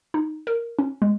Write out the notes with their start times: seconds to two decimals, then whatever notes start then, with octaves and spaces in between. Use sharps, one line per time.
0.14 D#4
0.47 A#4
0.79 C#4
1.02 G#3